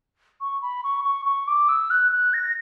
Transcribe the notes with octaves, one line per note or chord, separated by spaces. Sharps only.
C#6
B5
C#6
C#6
C#6
D6
E6
F#6
F#6
A#6